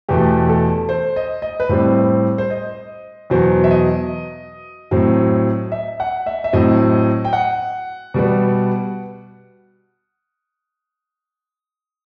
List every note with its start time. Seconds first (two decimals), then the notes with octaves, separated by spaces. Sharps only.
0.09 E2 B2 A3 G4
0.49 A4
0.89 C5
1.16 D#5
1.42 D#5
1.60 B4
1.69 A2 G3 C4 C5
2.38 C5
2.50 D#5
3.30 E2 B2 F#3 C5
3.64 E5
3.71 D#5
4.91 A2 F#3 C4
5.72 E5
6.00 F#5
6.26 E5
6.44 E5
6.53 A2 F#3 C4 D#5
7.25 G5
7.33 F#5
8.14 B2 G3 B3